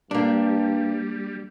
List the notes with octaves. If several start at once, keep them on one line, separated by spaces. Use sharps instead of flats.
G2 G3 A#3 D4